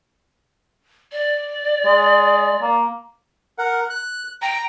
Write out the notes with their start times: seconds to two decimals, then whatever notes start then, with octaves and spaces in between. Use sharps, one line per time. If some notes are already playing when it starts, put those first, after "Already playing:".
1.12 D5
1.86 G#3
2.62 A#3
3.59 A#4 F#5
3.90 F#6
4.42 G5 A#5